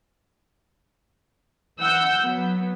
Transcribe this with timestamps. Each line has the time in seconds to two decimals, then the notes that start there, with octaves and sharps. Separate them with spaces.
1.81 E3 F#5 E6 G6
2.18 F#3 B3